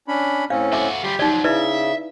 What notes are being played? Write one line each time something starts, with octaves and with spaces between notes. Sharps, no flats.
C#4 D4 B5
A2 C4 C#4 F5
F#4 A4 E5 G#5 D6
G3 F4 G4
F3 F#3 D#4 D5
C#3 E4 B4 D5 E5